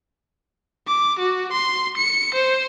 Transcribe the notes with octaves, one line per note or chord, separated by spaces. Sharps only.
D6
F#4
C6
C#7
C5